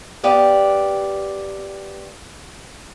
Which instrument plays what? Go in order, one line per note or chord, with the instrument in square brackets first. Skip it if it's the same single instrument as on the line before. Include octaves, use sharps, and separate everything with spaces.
[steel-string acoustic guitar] B3 G4 D5 F5